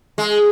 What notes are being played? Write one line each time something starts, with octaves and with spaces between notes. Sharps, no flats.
G#3